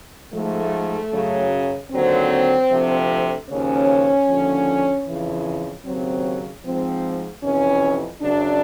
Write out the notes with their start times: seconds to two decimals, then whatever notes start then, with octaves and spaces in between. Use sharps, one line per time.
0.34 G#2 F3 A3
1.12 F#2 C#3 F#3
1.91 D#2 D3 F#3 C4
2.70 D2 C3 F3
3.49 D#2 C#3 F3 C#4
4.28 D#2 D3 F3
5.07 F2 C#3 E3
5.85 D#2 C#3 F#3 C4
6.65 G#2 F3 C4
7.43 F2 C3 E3 C#4
8.22 F#2 C#3 F#3 D4